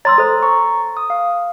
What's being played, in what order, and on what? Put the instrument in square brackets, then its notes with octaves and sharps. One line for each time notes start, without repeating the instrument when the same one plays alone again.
[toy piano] C#5 C6 E6 [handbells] A#5 A6
[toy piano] A4 C5
[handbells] A#5 C#6
D#6
F5